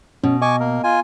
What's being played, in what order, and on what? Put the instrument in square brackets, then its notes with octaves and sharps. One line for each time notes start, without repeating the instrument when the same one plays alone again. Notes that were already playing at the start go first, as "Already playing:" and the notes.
[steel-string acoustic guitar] B2 [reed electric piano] C#4
[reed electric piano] D#5 [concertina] G#5 C#6 D6
[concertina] A#3 A#4
F4 G#5